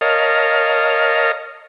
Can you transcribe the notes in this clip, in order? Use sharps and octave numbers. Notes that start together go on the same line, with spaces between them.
A#4 C#5 D#5 F5 A5